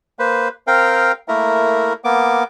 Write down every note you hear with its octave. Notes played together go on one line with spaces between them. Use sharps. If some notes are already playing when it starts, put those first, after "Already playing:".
A#3 B4 C5
C4 A#4 F5 G5
A3 A#3 E4 A#4
A#3 B3 D6